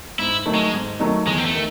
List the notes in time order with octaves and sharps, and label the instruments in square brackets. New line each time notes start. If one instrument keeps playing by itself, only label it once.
[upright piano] G#2 [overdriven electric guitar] E4
[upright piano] D#3 F#3 A3 D#4
[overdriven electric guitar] G#3
[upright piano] G#2
D#3 F#3 A3 D#4
[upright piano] E2 [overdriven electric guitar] G#3
[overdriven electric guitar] C4
A3
[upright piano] D#3